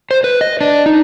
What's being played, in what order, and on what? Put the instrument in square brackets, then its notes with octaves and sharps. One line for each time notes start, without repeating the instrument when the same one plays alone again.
[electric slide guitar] C5
B4
D#5
D4
D#4